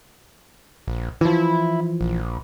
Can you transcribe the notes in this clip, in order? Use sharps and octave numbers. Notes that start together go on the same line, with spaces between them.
A#1
E3 F3 E4
A#1